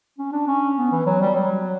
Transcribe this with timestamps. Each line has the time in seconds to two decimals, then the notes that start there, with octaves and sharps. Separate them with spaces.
0.18 C#4
0.33 D4
0.47 C#4
0.78 B3
0.92 E3
1.07 F#3
1.22 G3
1.36 F#3